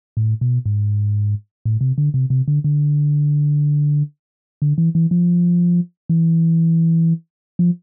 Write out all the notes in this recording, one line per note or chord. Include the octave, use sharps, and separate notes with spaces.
A2
B2
G#2
A2
C3
D3
C3
C3
D3
D3
D3
E3
E3
F3
E3
F3